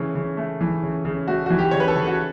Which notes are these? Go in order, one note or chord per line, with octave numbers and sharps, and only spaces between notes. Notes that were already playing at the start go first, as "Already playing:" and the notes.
Already playing: C#3 E3 A3
C#3
A3
E3
C#3
C#3
A3 F#4
E3 F#4
G4
C#3 C#5
B4
A4
C#3
F#4